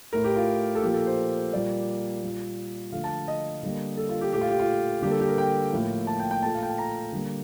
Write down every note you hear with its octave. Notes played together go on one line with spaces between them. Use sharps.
A2 A3 A#4
G4
F4
A4
A#2 F3 A#3 G4
A4
C5
A#2 G3 A#3 D5
A#2 G3 A#3
D3 F3 A3 F5
A5
D#5
D3 G3 A#3
A4
F4
G4
A#2 A3 G4
F4
G4
F4
D3 G3 A#3 G4
A4
G4
A#4
G5
A2 F3 A#3
A5
G5
G5
A#2 A3 A5
F5
G5
A5
A#5
D3 G3 A#3